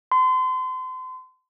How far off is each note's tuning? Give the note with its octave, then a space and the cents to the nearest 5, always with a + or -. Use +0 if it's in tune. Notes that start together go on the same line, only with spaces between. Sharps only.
C6 -35